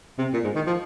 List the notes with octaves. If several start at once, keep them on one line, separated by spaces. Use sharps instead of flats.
C3
A#2
G#2
D#3
F3